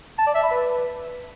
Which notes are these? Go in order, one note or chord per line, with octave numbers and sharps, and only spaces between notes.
A5
D5
E5
B5
B4